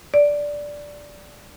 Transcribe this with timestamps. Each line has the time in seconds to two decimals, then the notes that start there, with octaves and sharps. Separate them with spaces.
0.14 D5